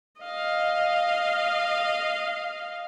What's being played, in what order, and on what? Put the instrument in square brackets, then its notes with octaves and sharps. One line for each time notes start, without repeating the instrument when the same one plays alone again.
[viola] D#5 F5